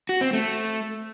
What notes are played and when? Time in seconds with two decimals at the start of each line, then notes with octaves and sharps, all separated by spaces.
0.09 F#4
0.21 C4
0.33 A3